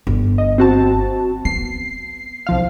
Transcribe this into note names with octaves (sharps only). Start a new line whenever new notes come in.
G1
D#5
C4 F#4 A5
B3 C7
C2 F3 F5